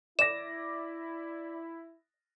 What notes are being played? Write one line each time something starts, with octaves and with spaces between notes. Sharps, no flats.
E4 D5 D6 A#6 E7